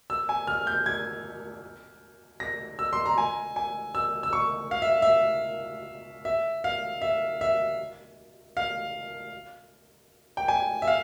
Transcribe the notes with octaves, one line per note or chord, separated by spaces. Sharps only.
E6
G#5
F6
G6
G#6
A#6
E6
C6
A#5
G#5
G#5
E6
E6
C#6
F5
E5
E5
E5
F5
E5
E5
F5
G5
G#5
E5
F5